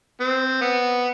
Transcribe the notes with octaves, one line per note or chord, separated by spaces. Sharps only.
C4
B3